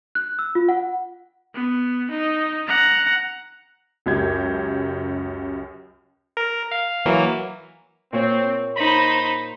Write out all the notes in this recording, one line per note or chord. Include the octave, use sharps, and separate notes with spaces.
F#6
E6
F4
F#5
B3
D#4
F#5 A#5
C#2 F#2 G4 G#6
A#4
F5
E3 F#3 A#3
A#2 C4 C#5
D#4 C5 B5